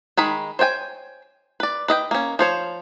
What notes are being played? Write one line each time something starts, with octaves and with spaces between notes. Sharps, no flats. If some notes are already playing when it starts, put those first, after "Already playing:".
D#3 G#3 B5
C5 C#5 G5 G#5
B4 D5
B4 D#5 E5 G5
A#3 C#4
F3 C5 C#5